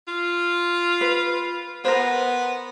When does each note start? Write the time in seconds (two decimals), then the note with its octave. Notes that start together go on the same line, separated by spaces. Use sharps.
0.08 F4
1.01 B4
1.85 B3 A#4 C5